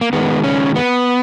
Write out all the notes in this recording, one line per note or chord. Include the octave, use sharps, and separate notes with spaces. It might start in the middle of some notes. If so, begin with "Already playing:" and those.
A#3
D#3 G#3 B3
C#4
B3